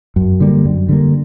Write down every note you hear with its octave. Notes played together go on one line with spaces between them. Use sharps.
F#2
D3 G3 A#3
F#2
D3 G3 A#3